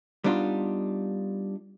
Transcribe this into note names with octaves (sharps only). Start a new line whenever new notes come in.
G3 B3 D4 D#4 F4